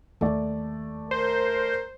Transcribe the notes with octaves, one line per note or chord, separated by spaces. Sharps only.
D#2 D#3 A3 D5
A#4 C5